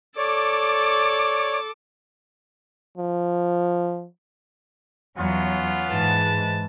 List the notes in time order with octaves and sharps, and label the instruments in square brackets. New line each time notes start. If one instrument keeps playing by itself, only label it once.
[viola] A4 D6 [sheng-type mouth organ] C#5 D5
[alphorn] F3
[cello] E2 F#3 [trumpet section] B3 C#4 F4
[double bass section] G#2 [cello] E3 [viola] B4 A5